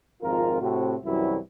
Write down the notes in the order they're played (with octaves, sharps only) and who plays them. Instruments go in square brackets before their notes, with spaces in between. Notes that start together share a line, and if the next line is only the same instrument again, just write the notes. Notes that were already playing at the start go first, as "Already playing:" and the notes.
[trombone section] G#1 F2 F4 A#4
A2 C3 C4 F#4
C2 F#2 E3 F#3 E4